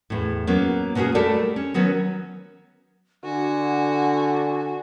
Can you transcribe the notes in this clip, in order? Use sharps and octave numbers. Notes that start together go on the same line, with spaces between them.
E2 A2
F#3 A#3 B3 C#4
B2 A#3 C#4 F#4 G#4
G3 A3 G4 A4 A#4 D5
C#4
D#3 F#3 B3 C#4
D3 F#4 G#5